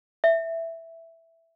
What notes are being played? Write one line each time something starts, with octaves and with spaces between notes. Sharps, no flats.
E5